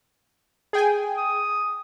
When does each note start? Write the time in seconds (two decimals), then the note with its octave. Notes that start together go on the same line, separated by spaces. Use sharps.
0.73 G#4 G5 G#5
1.17 D#6